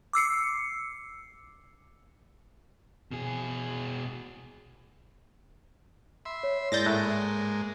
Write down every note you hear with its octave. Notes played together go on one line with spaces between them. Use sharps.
D6 E6 C7 C#7
B2 G#4
E5 B5 C6
C#5
G#2 G#3 A#3 E4 D5 G6 A6 A#6
A2 F#6